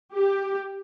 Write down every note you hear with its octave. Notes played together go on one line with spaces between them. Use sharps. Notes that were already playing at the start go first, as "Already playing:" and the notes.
G4